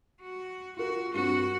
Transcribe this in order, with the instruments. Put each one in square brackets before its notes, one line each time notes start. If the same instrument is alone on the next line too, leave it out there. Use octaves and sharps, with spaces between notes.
[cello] F#4
[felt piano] F4 A#4 [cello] F#4
[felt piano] G2 C4 [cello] F#4